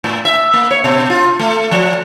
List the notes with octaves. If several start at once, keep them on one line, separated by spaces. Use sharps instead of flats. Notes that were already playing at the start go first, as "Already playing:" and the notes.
A2
E5
A#3
C#5
B2
F4
A3
F3